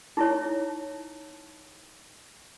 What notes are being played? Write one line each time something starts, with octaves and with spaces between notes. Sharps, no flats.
D#4 E4 C#5